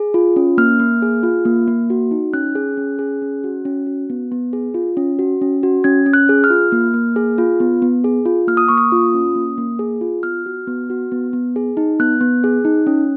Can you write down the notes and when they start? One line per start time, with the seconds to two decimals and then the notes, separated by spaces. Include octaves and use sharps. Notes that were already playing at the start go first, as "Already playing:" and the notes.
Already playing: G#4
0.14 F4
0.36 C#4
0.58 A#3 F6
0.80 A#3
1.02 G#4
1.23 F4
1.45 A#3
1.68 A#3
1.90 F#4
2.11 D#4
2.33 C#4 F#6
2.55 G#4
2.77 C#4
2.99 G#4
3.22 C#4
3.44 F#4
3.65 C#4
3.87 F#4
4.10 B3
4.32 B3
4.53 G#4
4.74 F4
4.97 C#4
5.19 F#4
5.41 C#4
5.63 F#4
5.84 C#4 G#6
6.06 C#4
6.13 F#6
6.29 G#4
6.44 F6
6.50 F4
6.72 A#3
6.94 A#3
7.16 G#4
7.38 F4
7.60 B3
7.82 B3
8.04 G#4
8.26 F4
8.48 A#3 F6
8.57 D#6
8.68 A#3 C#6
8.78 D#6
8.92 F4
9.14 C#4
9.35 A#3
9.58 A#3
9.79 G#4
10.01 F4
10.23 B3 F6
10.46 F#4
10.67 B3
10.90 F#4
11.12 B3
11.33 B3
11.56 G#4
11.77 D#4
12.00 B3 F#6
12.21 B3
12.44 G#4
12.65 D#4
12.87 C#4